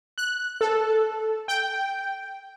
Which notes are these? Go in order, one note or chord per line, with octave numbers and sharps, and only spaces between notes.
F#6
A4
G5